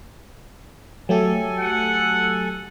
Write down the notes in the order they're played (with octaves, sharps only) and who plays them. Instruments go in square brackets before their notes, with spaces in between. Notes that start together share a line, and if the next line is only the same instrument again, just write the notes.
[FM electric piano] F#3 A3 G4 [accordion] A4 G#5
[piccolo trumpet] F#5